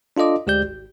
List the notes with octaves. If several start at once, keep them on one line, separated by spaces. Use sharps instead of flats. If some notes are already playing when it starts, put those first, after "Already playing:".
D4 F4 A4 D#5 D6
D2 G#3 G4 D5 G6
G#1